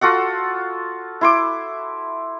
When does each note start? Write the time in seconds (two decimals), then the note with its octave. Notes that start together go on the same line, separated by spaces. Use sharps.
0.01 F4 F#4 A4 F#5
1.21 E4 C6 D6